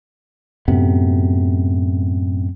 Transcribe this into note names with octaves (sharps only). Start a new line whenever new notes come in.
F#2 A2 C3 B3